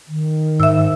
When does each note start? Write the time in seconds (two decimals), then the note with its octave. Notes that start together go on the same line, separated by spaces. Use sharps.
0.08 D#3
0.60 G#2 E5 E6